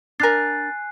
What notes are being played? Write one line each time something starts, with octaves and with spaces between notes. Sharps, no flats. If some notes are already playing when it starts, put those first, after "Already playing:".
D4 A#4 G#5 F#6 A6 C7